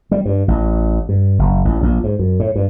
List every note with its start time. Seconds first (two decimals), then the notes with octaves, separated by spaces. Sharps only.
0.11 G3
0.26 G2
0.48 A1
1.09 G2
1.39 F#1
1.65 A1
1.82 A#1
2.04 G#2
2.19 F#2
2.40 A2
2.56 G2